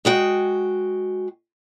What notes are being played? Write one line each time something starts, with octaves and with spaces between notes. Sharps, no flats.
G#3 F#4 G5